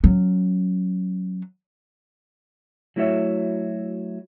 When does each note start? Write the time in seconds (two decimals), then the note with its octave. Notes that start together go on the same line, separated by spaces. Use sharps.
0.04 F#3 C#4
2.96 F#3 A3 E4 F#4 C#5 E5